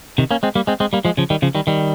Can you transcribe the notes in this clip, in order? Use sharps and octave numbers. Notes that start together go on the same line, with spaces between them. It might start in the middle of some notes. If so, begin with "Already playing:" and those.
C3 D#3
A#3 C#4
G#3 C4
G3 A#3
G#3 C4
G#3 C4
G3 A#3
F3 G#3
C#3 F3
D#3 G3
C#3 F3
D#3 G3
D#3 G3